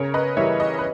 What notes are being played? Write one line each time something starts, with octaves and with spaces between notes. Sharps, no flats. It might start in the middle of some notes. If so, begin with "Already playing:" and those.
Already playing: C#3 A#4 C#5
B4 D#5
E3 G3 C#5 E5
B4 D#5
B4